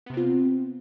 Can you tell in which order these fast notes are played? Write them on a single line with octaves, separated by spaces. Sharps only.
B3 C3 C4 F4